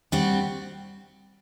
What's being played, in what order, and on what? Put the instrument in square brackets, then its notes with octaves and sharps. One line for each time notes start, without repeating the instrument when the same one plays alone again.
[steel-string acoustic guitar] G3 C4 F#4